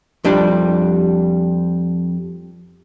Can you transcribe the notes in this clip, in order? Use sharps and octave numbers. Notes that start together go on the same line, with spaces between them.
F2 G3 D4